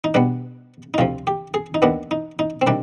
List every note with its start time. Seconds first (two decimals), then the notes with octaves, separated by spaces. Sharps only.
0.04 D#4
0.14 B2 G3 B3 D4
0.94 D#4
0.98 D2 C3 F3 F4
1.27 G4
1.54 G#4
1.74 D#4
1.82 D#2 D#3 B3 D4
2.11 D#4
2.39 D#4
2.62 C4
2.67 C3 D#3 G3 D4